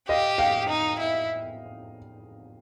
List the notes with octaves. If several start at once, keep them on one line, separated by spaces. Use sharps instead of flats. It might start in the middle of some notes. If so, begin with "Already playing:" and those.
G4 D#5 F5
F5 G5
D#4
E4